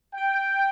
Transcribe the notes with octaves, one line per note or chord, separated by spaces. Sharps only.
G5